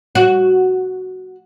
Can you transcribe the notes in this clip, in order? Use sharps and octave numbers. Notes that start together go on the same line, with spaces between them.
F#4